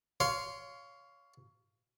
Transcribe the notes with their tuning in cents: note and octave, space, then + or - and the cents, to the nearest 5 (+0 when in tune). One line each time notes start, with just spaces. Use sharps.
C#5 +20 F5 +0 C6 +0